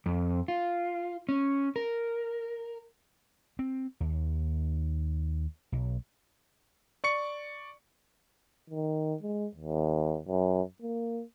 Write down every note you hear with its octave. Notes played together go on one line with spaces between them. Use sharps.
F2
F4
C#4
A#4
C4
D#2
B1
D5 C#6 C#7
D#3
G#3
D#2
F#2
A#3